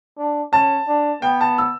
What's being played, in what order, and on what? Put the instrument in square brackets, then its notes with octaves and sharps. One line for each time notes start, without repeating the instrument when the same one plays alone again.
[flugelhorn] D4
[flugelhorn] C#4 [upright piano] A5
[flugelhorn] D4
[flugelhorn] B3 [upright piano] G5
[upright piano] A5
E6